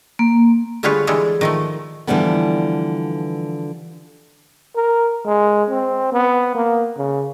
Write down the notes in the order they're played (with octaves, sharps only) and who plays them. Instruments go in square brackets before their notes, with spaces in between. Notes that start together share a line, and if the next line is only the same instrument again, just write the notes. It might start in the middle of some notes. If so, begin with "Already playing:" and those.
[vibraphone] A#3
[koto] D3 G3 F4 G#4 B4 C#5
D3 E3 G3 G#3 G#4 A4
D#3 F3 A3
[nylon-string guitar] D3 E3 F3 G3 A#3 B3
[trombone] A#4
G#3
C4
B3
A#3
C#3